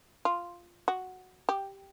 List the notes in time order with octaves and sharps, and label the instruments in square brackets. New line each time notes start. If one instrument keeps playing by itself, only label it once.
[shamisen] F4
F#4
G4